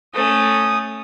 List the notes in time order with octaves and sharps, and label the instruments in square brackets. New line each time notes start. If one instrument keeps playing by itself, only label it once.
[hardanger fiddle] A3 C#4 [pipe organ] D#6